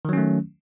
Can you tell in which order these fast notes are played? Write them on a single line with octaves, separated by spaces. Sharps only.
D#3 F#3 C#4 A3